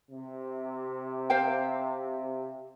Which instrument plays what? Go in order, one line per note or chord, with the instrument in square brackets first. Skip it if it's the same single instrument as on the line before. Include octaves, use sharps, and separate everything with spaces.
[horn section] C3
[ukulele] C5 F5 G5